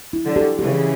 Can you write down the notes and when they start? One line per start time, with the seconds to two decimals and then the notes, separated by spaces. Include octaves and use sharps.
0.13 E4
0.25 D3 F#3
0.36 G4
0.59 C#3 E3 G4